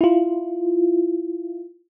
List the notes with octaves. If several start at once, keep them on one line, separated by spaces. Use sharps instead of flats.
E4 F4